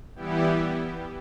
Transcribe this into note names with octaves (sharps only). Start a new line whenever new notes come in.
E3 G3 B3 E4 G4